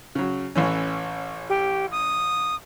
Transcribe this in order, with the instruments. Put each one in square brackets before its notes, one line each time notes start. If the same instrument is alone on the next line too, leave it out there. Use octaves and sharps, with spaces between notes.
[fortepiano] C#3 F#3
A1 E3 C#4
[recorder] G4
D#6